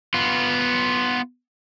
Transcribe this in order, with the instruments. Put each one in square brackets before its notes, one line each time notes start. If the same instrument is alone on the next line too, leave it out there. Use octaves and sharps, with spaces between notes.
[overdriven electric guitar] B3 F4